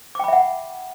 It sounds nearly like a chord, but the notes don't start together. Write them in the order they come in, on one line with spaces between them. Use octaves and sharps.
D6 G5 B5 E5 F#5